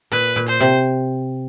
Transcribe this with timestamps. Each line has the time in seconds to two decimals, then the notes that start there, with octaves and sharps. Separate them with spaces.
0.12 A#2 B4
0.36 A#2
0.49 C5
0.60 C3